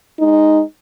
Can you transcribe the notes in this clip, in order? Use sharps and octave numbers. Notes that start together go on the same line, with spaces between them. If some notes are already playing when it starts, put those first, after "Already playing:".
G#3 D#4